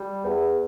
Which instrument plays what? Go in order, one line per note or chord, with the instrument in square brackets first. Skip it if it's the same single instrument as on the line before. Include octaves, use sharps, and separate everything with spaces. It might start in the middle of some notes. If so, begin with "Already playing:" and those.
Already playing: [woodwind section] G3
E2